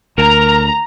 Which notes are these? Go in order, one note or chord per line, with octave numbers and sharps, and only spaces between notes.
D2 A#4 A#5